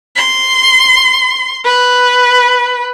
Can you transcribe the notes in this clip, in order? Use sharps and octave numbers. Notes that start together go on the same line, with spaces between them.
C6
B4